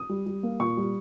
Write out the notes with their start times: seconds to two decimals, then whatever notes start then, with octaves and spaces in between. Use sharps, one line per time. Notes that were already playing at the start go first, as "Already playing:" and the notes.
Already playing: D#6
0.09 G3
0.26 G3
0.43 A#3
0.60 A#2 C#6
0.77 G3